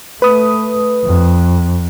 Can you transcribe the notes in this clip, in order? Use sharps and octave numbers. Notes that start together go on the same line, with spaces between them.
A3 B4 D#6
F2